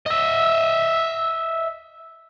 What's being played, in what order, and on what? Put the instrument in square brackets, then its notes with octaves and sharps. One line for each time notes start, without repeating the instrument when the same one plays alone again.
[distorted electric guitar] D#5 E5